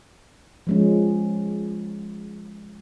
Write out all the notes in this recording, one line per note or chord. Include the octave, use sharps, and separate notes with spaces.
F3 G#3 C#4